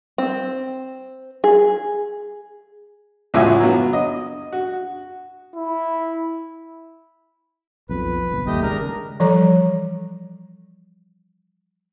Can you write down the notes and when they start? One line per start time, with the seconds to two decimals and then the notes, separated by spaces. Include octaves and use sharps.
0.18 C4
1.44 G#4
3.34 C#2 A2 F4 F#4 E5 G#5
3.61 F#3 B3
3.93 D#5
4.53 F#4
5.55 E4
7.89 B1 F2 B4
8.32 G1
8.47 D#2 A3 G4 D#5
8.63 C#3 G#3 D4 A#4 A#5
9.20 E3 F3 G3 A4 C#5 A#5